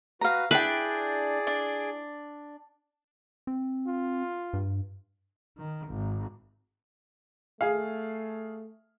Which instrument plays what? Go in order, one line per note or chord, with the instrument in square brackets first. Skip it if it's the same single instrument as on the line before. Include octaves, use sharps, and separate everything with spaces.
[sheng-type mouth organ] F#4 B4 [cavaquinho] F5 A#5
[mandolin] D4 G5 [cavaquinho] E4 [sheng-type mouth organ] G#4 D5 [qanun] B4
[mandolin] D4
[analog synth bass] C4
[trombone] F4
[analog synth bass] G2
[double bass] D#3
G#1
[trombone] A3 [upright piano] G#4 F5